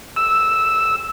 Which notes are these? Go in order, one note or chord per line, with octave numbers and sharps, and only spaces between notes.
E6